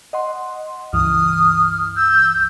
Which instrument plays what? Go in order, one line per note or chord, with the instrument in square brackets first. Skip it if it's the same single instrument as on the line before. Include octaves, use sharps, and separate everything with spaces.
[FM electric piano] D#5 F#5 C6
[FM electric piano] C#2 G2 E3 [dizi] D#6 [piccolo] F6
[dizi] E6 [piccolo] G6